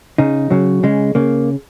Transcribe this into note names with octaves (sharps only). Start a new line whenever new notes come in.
C#3 D#4
C#3 F#3
C#3 G#3
C#3 A#3